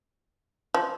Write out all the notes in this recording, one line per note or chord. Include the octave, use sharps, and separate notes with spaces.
F3